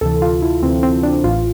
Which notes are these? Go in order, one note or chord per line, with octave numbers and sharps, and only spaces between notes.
D2 C3 E3 A4
F4
E4
D2 C3 E3 C4
C4
D4
A1 A2 E3 F4